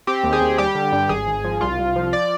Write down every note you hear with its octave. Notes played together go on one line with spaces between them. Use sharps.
C4 G4
D#2
G#4
D#2
G3 G4
D3
G2
G#1 G#4
G#1
F3
C2 F4
C2
F3
D5